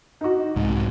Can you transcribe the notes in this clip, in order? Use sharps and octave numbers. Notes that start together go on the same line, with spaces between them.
D#4 F#4
C2 G#2